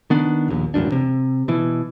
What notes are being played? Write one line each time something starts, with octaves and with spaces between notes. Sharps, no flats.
D#3 B3 D4
A#1 D#2
E1 A1 F#2 D4
C3
B2 E3